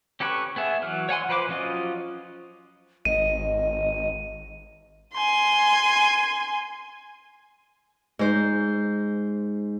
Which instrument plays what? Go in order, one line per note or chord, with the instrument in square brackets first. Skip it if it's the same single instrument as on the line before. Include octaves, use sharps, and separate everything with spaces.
[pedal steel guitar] C#4 G4 A4 B4 C#5
B3 G#4 E5
E3 F#3 F6
C#5 F#5 G#5 C6
F3 B4 C5 F#5 D6
F3 F#3 C#4 F4 D#5
[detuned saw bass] G#1 [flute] D#5 [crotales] D#7
[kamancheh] G#5 C6
[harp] G#2 C5